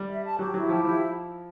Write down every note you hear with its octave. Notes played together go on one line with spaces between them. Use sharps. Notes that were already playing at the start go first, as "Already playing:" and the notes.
Already playing: G3
E5
A5
F#3 G4
F#3 E4
F3 G4
F3 E4